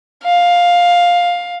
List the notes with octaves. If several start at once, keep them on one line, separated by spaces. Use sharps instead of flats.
F5